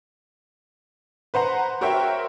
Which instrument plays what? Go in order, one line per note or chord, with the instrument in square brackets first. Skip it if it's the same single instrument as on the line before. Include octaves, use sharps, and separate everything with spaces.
[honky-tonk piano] B4 C5 F#5 A#5
F#4 A#4 C5 C#5 E5 G5